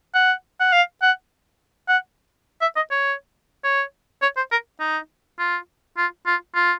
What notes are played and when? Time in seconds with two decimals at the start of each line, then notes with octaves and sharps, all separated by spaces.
0.15 F#5
0.60 F#5
0.73 F5
1.02 F#5
1.88 F#5
2.62 E5
2.76 D#5
2.91 C#5
3.64 C#5
4.22 C#5
4.37 C5
4.52 A#4
4.80 D#4
5.39 F4
5.97 F4
6.27 F4
6.55 F4